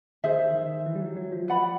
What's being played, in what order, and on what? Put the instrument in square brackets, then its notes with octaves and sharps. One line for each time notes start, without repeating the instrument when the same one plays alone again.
[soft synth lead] D#3 [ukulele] G#4 C5 E5
[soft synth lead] D#3
E3
G3
F#3
F#3
F3
[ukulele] B4 D5 F#5 B5